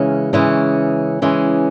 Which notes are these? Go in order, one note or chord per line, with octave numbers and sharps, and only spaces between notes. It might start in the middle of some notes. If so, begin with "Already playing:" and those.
Already playing: C#3 E3 G#3 C#4
C#3 E3 G#3 C#4
C#3 E3 G#3 C#4